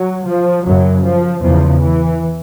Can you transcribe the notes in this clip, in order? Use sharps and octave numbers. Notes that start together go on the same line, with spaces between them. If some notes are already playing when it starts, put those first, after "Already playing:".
Already playing: F#3
F3
F#2 C#3 F#3
F3
E2 C#3 F3
E3